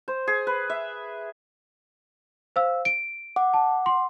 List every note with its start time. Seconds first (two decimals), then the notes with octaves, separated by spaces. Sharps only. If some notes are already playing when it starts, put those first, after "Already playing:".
0.08 C5
0.27 G#4
0.47 B4
0.70 E5
2.56 C5 F5 E6
2.85 D7
3.36 F#5 D6
3.53 A5
3.86 C6